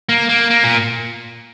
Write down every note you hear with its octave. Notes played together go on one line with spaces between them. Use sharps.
A#3
A#3
A#3
A#2